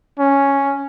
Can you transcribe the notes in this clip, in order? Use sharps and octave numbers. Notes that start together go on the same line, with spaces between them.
C#4